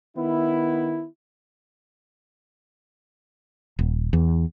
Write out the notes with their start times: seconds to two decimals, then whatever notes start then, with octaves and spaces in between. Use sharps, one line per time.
0.17 D#3 B3 E4
3.79 D#1
4.13 E2